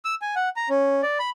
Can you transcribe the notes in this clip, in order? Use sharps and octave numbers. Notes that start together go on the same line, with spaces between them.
E6
G#5
F#5
A#5
C#4
D5
B5